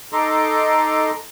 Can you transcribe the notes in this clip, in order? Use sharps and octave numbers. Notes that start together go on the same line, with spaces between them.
D#4 A4 D#5 A#5 C6 D6